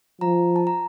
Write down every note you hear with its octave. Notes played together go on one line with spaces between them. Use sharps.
F3 A#5
A5
A#5